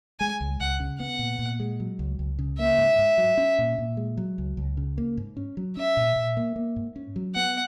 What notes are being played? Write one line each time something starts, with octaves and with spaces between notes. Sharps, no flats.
G#3 G#5
C#2
C#2 F#5
C#3
B3 F#5
A#2
A#2
G#3
F#3
C#2
C#2
C#3
A#3 E5
G#2
G#2
F#3
C#4
A#2
A#2
G#3
F#3
C#2
C#2
C#3
A#3
G#2
C#4
F#3
C#4 E5
A#2
A#2
A#3
A#3
G#2
C#4
F#3
B3 F#5